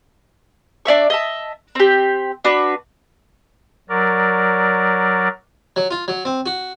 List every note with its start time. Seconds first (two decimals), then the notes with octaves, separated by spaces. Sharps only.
0.85 D4 D5 E5 C#6
1.10 D#5 E5 A5
1.75 C4 G4
2.44 D4 F#4 B4
3.89 F#3 A#4 D5
5.76 F#3
5.91 F4
6.08 F#3
6.25 C4
6.46 F#4